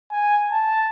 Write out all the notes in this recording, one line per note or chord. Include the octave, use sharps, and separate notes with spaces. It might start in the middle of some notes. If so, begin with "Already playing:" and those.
G#5
A5